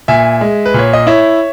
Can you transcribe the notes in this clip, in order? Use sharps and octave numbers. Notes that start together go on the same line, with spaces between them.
A#2 E5 G#5
G#3
B4
A#2 C#5
D#5
E4 C#5 E5